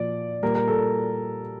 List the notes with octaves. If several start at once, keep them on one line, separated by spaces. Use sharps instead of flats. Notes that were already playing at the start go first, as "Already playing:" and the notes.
Already playing: A#2 F3 D5
A#2 G3 A#4
A#4
A4